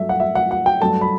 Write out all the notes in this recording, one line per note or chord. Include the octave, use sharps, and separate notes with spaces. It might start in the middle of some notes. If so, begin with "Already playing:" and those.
Already playing: G2 F#3 A3 E5
F#5
E5
F#5
F#5
G5
G2 F#3 A3 A5
B5